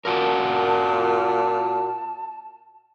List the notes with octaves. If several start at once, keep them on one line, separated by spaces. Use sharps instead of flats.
A#2 F4 F#4 A#4 A5